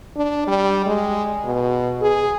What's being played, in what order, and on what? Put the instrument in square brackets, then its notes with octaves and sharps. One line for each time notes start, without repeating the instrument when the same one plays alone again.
[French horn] D4
G3
G#3
B2
G#4